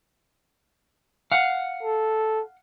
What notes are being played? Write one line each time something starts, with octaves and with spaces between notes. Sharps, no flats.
F5 F#5
A4